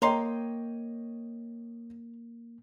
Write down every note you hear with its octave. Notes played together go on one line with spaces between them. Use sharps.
A#3 C#5 D#5 F5 G5 A#5 C6